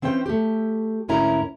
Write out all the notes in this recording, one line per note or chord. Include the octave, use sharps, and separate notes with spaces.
E3 C4 C#4 C5 G5
A3 G4
D2 G#2 C#4 E4 A#4 A#5